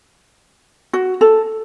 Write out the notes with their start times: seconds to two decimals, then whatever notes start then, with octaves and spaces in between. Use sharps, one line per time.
0.93 F#4
1.21 A4